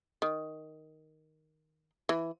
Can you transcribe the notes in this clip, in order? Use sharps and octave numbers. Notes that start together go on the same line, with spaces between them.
D#3
E3